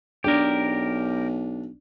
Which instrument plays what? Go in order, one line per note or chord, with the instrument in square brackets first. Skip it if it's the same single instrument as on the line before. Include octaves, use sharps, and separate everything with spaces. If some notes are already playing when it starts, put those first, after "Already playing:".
[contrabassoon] B1 [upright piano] D4 [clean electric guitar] G4 A#4